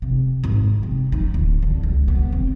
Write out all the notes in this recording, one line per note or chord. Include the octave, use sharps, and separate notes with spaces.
C3
G#1
C3
D#4
D1
D3
C#2
B3
C4